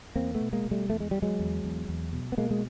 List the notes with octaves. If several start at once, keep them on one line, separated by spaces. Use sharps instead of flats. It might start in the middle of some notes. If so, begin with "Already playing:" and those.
E2 A#3 C4
A3 B3
B2
G#3 A#3
B2
G3 A3
E2 A3
G#3
E2 G3
F#3 G#3
E2
E2
E2
B2
B3
B2 G#3 A#3
G#3